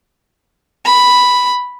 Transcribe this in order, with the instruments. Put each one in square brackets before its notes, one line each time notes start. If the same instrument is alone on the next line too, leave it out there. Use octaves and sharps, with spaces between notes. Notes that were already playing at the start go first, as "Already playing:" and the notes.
[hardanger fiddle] B5